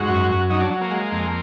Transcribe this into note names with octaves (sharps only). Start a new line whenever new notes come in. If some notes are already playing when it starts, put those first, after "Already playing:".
Already playing: G#2 F#4
F#2
F#2
F#3 D#4
D4
F#3
A#3
G#3
F2